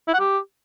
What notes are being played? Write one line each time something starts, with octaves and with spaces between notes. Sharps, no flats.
E4
F#5
G4